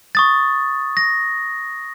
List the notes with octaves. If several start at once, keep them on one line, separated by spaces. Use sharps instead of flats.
C#6 D#6 A6
A#6